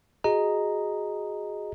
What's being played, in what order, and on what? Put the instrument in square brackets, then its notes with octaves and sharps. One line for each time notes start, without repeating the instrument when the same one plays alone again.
[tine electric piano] F#4 G#4 D#5 A#5